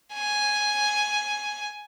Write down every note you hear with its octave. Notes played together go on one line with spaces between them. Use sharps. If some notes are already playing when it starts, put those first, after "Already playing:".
G#5